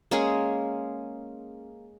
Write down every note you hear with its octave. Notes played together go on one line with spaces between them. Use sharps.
G#3 A#3 C#4 G#4